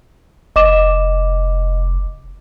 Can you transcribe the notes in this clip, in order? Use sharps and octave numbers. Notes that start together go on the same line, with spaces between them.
F1 D#5 D6 E7